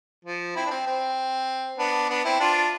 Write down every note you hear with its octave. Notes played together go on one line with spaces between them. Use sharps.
F3
C4 E4
D4
C4
C4
B3 D4
B3 D4
C4 E4
D4 F4